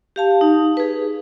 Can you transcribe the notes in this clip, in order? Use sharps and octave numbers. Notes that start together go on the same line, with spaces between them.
G4 F5 A5
D#4
G#4 B4